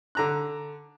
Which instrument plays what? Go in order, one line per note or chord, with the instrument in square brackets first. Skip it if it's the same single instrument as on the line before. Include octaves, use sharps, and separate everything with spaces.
[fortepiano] D3 A#5 F#6